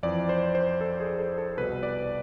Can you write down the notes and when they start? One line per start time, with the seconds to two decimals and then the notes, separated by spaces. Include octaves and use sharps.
0.03 F2 E3 D5
0.29 C5
0.55 C5
0.81 A4
1.00 G#4
1.18 A4
1.38 A4
1.57 C2 B2 B4
1.83 D5